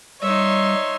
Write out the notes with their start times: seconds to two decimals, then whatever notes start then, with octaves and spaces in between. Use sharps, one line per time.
0.22 G3 D#4 C#5 E5 C6